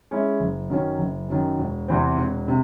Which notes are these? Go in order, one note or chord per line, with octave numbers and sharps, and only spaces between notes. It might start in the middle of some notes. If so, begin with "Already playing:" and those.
G#3 C#4 E4
F#1
F#2 D#3 F#3 C#4
F#1
F#2 D#3 F#3 C#4
E1
E2 C3 E3 C4
E1
C3